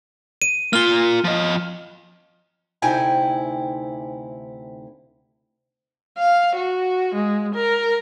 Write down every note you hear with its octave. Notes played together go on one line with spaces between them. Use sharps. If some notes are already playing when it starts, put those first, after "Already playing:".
D#7
A#3 F4 F6 G7
F3 D#5
D2 C3 D#4 E4 G5 G#5
F5
F#4
G#3
A#4